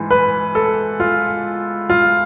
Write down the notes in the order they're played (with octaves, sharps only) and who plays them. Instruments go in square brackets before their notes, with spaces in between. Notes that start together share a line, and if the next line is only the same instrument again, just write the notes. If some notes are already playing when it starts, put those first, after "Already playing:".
Already playing: [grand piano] G#2 E3
B4
A4
F4
F4